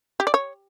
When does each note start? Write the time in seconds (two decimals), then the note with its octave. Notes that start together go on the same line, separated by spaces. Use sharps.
0.20 G4
0.27 D5
0.34 C#5